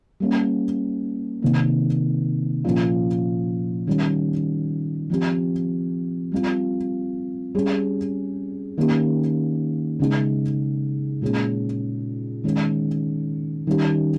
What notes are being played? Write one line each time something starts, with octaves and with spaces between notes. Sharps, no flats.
G3 A#3 C#4
C3 D#3 A#3
A#2 F3 A#3 C#4 F4
D#3 G3 C#4
F3 C4 G4
G3 C4 F4
G3 C#4 G#4
D#3 A#3 C#4 G4
C#3 G#3 D#4 G#4
A#2 G#3 C#4 G#4
D#3 G#3 C#4
D#3 G3 C#4 G4